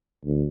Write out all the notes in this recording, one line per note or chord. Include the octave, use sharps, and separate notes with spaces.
D2